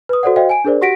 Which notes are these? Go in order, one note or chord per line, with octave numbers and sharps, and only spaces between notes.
B4 D#6
F#4 A4 C5 D5 F#5
F#4 C5 D#5 F5 G5
G#5 D7
D4 G#4 A#4 C5 D5
F#4 G4 F#5 A#6 B6 D7